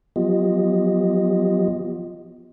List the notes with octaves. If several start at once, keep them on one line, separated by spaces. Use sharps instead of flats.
F3 F#3 B3 F4 G4 D#5